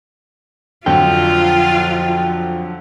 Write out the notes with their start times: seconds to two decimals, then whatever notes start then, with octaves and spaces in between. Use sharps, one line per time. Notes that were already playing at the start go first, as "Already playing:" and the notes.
0.86 F2 D3 F3 F#3 F4 G5